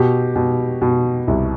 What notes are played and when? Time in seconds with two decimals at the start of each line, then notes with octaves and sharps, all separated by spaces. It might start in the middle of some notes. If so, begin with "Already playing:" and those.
Already playing: B2 G4
0.36 B2
0.82 B2
1.28 C2